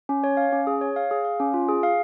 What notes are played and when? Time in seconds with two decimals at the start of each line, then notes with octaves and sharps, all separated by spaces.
0.09 C#4
0.24 C#5
0.37 F5
0.52 C#4
0.67 G#4
0.81 C#5
0.96 F5
1.11 G#4
1.25 F5
1.40 C#4
1.54 F4
1.69 G#4
1.83 F5